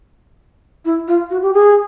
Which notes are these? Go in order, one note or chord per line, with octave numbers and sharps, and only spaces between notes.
E4
F4
F#4
G4
G#4